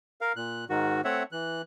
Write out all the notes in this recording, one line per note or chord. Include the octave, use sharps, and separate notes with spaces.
A#4 F5
A#2 F#6
G#2 D#3 F#4
A3 C4 C#5 E5 F#5
E3 F#6